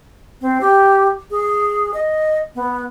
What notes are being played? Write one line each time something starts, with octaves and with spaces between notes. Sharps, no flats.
C4
G4
G#4
D#5
B3